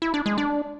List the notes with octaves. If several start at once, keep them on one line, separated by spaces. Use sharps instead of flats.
E4
D4
G#3
D4